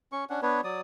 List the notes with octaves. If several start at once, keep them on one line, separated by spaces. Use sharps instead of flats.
C#4 C#6
C#4 D4 F#5
B3 D4 B4 C#5
F#3 D5 D#6